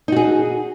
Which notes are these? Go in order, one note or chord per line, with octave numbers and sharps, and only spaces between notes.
D#4 F#4 G#4